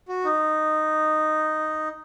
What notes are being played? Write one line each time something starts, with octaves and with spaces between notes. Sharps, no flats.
F#4
D#4